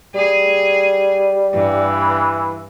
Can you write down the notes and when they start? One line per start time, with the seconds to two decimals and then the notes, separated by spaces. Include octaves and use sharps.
0.15 G3 G#4
1.54 G2 E3